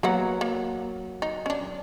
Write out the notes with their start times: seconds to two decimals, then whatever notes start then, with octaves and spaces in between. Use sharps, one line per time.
0.03 F#3 A#3 B3 F#5 A#5
0.41 A#3
1.22 D#4
1.46 C#4 D4